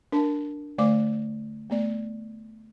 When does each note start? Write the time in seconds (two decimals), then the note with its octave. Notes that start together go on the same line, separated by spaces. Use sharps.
0.12 D4 A#4 A5
0.78 D3 A3 D5 F5 D6
1.70 A3 B3 D5